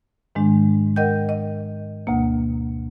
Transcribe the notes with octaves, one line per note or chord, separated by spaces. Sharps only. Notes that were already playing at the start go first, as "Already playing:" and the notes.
G#2 D#3 G#3 D4
A#4 D#5 F#5 G5 G6
D#5
D2 B2 A#3